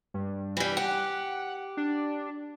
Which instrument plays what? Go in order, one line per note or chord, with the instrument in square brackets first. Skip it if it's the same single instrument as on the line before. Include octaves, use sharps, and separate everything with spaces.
[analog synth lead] G2
[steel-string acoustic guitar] E3 G3
[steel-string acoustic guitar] G4 [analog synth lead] F#5
[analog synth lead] D4